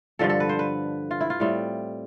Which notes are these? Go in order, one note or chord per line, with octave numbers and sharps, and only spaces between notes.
G2 D3 F3 A4
A4
B4
C5
B4
F4
E4
F4
A2 G3 C4